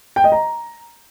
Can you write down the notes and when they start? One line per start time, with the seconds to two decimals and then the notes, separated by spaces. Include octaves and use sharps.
0.16 G5
0.24 D#5
0.32 A#5